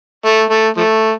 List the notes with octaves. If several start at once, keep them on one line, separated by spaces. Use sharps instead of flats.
A3
A3
F3 A3